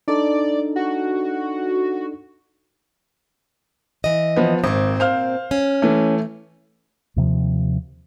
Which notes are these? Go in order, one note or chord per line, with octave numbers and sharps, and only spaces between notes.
D4 D#4 A4 D5
F#4
E3 D#5
F3 B3
G#1 A#2 C4
C5 F5 F6
C#4
E3 A3
D#2 C3 F3